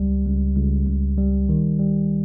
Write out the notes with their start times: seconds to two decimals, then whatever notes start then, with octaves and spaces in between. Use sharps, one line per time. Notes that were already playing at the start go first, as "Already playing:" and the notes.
Already playing: C#2 G3
0.25 C#2
0.57 C#2
0.87 C#2
1.18 G3
1.49 D#3
1.79 G3